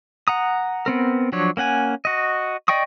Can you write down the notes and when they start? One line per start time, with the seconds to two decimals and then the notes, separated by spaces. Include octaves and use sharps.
0.28 F#5 A#5 D#6
0.86 B3 C4 A#4
1.32 F3 F#3 D4 C#5
1.57 A#3 C#4 F#5 G#5
2.05 F#4 D#5
2.68 D5 D#5 G5 C#6 D#6